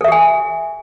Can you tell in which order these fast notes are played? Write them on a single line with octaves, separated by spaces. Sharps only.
A4 E5 G4 G#5